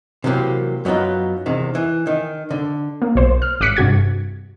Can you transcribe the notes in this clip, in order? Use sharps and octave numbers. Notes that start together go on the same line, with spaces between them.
C3 E3 F#3 A#3 G4
F#2 F#3 B3 D#4 F4
E2 C3 D#3
E3
D#3
D3
A#3
B1 C5
F6
G#1 D6 F#6 B6 C#7
G2 C3 F#4 G#6